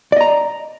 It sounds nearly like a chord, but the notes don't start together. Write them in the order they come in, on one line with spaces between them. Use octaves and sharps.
D5 D#5 A#5